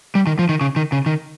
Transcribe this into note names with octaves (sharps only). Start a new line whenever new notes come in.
G3
D#3
F3
D#3
C#3
D#3
C#3
D#3